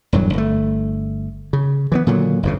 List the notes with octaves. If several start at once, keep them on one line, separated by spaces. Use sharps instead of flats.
E1 G2 F#3
G1 A3
C#3
E3 F3 B3
A#2 D3 D#3 F#3
G1 F2 C#3